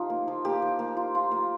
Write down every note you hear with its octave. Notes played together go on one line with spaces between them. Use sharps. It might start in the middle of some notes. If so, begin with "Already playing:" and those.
Already playing: F3 D#4 F4 G4
A#3
F3
A#3 G4
F3
A#3
F4
F3 F4
A#3